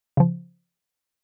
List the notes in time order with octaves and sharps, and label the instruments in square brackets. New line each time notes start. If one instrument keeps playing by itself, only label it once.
[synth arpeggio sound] C#3 F3